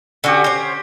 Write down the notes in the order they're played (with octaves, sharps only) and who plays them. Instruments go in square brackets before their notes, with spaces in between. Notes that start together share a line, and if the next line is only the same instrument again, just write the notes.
[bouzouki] D3 F#4 [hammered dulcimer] C#4 G4
[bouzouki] C5 C#5